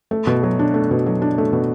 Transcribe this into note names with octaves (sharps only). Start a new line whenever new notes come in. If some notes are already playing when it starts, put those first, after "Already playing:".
A3
B2
F#3
D4
A3
B2
F#3
D4
A3
B2